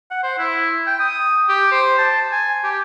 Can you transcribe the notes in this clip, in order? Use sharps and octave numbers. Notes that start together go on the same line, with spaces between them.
F#5
C5
E4
G5
D#6
G4
C5
A5
G#5
G4